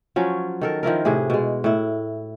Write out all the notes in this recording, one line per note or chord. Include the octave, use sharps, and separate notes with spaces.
F3 F#3 C#4
D#3 A4 A#4
D#3 F3 E4 A#4
A2 C3 E4 G#4
B2 G#3
A2 E4